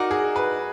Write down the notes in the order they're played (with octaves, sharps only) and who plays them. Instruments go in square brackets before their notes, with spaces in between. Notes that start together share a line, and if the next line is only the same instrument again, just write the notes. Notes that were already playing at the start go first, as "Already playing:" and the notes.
Already playing: [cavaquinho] D#4 A#4 D5 F#5 [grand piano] F#4
[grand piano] G#4
B4